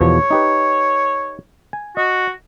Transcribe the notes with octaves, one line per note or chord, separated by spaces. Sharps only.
E2 B2 F3 C#5
D#4 G4 B4
G#5
F#4 D#5